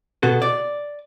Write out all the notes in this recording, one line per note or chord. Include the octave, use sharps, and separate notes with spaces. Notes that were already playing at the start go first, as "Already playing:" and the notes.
B2 B3 F#4 A4
D5